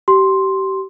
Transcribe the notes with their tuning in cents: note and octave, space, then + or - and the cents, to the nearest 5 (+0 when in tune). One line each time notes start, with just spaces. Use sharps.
G4 -30 C6 +5